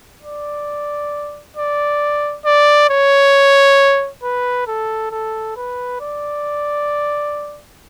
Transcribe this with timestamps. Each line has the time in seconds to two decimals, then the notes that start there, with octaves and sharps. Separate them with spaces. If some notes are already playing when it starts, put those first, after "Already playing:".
0.22 D5
1.57 D5
2.45 D5
2.90 C#5
4.23 B4
4.67 A4
5.11 A4
5.56 B4
6.01 D5